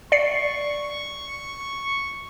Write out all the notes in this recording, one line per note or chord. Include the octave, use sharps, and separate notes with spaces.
D5 C#6 C7 C#7